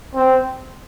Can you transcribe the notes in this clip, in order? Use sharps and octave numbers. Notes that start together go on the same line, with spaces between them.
C4